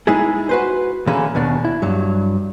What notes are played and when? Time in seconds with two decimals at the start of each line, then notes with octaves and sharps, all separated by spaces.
0.07 G#3 D#4 E4 G#4
0.49 F#4 B4 C5
1.07 D3 E3 A#3 C#4 G#4 B5
1.35 D#2 B2 D4
1.65 E4
1.82 G2 F#3